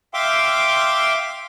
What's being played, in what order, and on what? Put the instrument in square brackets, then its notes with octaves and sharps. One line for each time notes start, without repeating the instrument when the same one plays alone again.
[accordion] E5 F5 G5 C6 D6